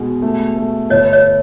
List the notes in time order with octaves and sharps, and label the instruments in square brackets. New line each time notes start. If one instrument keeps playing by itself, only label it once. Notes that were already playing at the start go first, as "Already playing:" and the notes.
Already playing: [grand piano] B2 G#3
A3
A3
[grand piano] G1 [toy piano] C#5 D#5
[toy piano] C#5 D#5